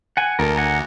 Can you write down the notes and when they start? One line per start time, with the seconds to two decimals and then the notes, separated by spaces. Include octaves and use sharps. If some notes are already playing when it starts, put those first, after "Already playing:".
0.17 F#5 G#5
0.39 D2 A4 A#4
0.57 F#5 G#5 A#5